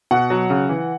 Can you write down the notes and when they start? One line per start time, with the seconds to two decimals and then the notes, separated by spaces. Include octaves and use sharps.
0.11 B2 F#5
0.30 F#3
0.50 C#3
0.69 E3